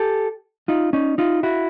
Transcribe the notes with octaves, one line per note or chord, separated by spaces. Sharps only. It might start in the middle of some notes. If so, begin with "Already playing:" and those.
Already playing: G4 A4
D#4 F4
C#4 D#4
D#4 F4
E4 F#4